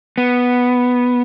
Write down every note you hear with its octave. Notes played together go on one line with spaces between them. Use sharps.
B3